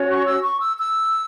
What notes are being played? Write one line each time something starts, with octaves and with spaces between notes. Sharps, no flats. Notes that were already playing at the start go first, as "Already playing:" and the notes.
Already playing: C#4 F#4 C#5
C#6
E6
C#6
E6
E6